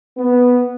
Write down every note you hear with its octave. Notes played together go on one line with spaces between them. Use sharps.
B3